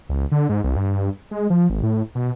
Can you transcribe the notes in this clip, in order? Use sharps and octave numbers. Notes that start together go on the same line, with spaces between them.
C#2
D3
G#2
C2
G2
G#3
F3
G#1
A2
B2